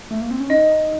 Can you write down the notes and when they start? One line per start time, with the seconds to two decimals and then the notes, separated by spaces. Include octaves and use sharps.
0.11 A3
0.21 A#3
0.31 C4
0.40 C#4
0.50 D#4 D#5